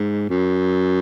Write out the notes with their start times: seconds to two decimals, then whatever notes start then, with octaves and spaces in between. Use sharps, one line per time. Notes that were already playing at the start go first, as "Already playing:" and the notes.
Already playing: G#2
0.30 F#2